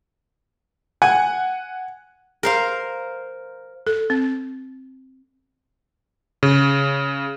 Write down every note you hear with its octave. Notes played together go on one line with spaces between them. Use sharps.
F#5 G#5
A#4 C5 F5
A4
C4
C#3